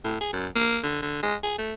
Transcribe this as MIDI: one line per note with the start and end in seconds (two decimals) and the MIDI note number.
0.04 0.19 45
0.21 0.30 68
0.33 0.47 42
0.55 0.78 58
0.83 1.02 50
1.02 1.22 50
1.23 1.35 56
1.43 1.56 68
1.58 1.74 57